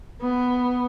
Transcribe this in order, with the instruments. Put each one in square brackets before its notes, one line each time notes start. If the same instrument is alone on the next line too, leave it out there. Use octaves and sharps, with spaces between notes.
[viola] B3